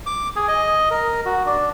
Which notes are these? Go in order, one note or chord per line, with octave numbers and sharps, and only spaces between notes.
D6
G#4
D#5
A#4
F#4
D4